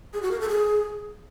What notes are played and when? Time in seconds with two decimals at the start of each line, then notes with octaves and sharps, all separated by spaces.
0.13 G#4
0.22 F#4
0.31 A#4
0.40 A4
0.49 G#4